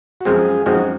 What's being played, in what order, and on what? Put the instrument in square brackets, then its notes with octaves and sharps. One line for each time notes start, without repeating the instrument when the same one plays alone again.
[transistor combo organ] F#4
[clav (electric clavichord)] F#2 F3 G#3 C4 [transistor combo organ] F4 G#4
[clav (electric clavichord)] F#2 F3 G#3 C4 [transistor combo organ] D#4 F#4